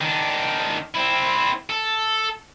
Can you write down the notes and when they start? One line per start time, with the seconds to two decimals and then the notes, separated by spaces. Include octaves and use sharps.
0.01 D#3 D4
0.94 C4 E4
1.70 A4